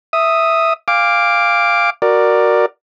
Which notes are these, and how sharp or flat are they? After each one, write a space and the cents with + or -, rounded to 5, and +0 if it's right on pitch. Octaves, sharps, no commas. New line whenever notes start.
E5 +0 D#6 +0
F5 +0 G#5 -45 D6 +0
F#4 +5 A#4 +0 D5 +10